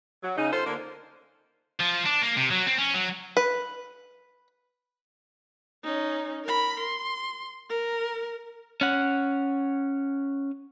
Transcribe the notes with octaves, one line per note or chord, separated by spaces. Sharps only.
F#3
C#3 D#4
F4 A4 C5
D3 A#3
F3
D4
A#3
C3
F#3
C4
C#4
F#3
B4
C#4 D#4
A#4 B5
C6
A#4
C#4 F#5